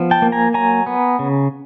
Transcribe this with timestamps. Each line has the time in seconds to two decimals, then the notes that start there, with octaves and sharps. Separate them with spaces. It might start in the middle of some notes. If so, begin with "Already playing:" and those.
Already playing: F3 B3
0.11 G5 A5
0.22 A#3
0.32 G#5 A#5
0.54 F#3 G#5 A#5
0.87 B3
1.19 C#3